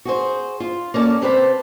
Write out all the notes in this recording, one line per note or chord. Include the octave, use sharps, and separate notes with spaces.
F#4 G#4 C5
F4
A#3 C#4 A4 D5
C3 C4 G4 B4 C5 A5